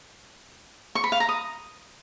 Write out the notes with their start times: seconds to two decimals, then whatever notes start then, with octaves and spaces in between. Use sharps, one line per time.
0.95 C#6
1.04 B5
1.12 F5
1.20 A#5
1.29 D#6